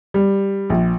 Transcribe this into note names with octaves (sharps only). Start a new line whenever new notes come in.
G3
A#1